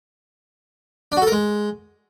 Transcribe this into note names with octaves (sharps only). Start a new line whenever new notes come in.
D4
F#4
A4
A#4
G#3